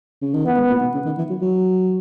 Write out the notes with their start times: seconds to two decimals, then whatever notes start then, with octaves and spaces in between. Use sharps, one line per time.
0.22 C#3
0.34 D#3
0.45 E3 B3
0.57 G#2
0.70 A#2
0.81 B2
0.94 C#3
1.06 D#3
1.18 E3
1.30 F#3
1.42 F#3